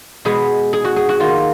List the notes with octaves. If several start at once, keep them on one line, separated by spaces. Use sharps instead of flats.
B2 G#3 B3 G#4
G#4
F#4
G#4
F#4
D#3 A#3 F4